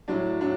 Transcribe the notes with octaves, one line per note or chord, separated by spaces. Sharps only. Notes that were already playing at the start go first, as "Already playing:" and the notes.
A2 F#3 D4
A2 F#3 D4